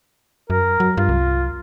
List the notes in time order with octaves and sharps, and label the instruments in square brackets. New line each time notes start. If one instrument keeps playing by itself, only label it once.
[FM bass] F#2 [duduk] A#4
[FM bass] F#3
[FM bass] G2 [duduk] F4
[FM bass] C2